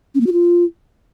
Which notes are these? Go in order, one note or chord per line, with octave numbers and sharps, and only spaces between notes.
C#4
A#3
F#4
F4